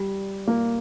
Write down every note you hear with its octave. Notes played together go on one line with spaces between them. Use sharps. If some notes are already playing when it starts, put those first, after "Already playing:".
Already playing: G3
A#3